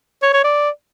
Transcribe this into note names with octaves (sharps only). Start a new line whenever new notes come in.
C#5
C#5
D5